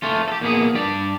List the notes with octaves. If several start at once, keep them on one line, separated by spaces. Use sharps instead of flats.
A3 C#4 F4
G4 A4
A#2 A#3 B3 G#4
G2 G4 D5